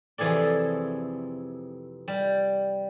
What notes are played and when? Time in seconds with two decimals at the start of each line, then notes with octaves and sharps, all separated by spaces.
0.18 F2 C3 E3 G#4 A4 D5
2.08 G3